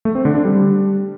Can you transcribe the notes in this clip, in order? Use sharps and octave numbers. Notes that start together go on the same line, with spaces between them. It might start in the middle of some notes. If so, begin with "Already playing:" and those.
A3
C4
D3
D4
G3